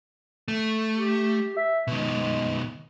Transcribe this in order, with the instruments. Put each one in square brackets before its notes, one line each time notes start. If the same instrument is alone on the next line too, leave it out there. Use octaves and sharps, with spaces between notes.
[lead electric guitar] A3
[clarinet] G4
E5
[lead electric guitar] B2 D#3 [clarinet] G#3